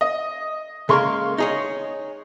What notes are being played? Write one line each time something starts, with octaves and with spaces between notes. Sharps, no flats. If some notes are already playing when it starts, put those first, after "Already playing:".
D#5
C#3 G#3 A#3 A#4 C6 C#6
D#4 G#4 C#5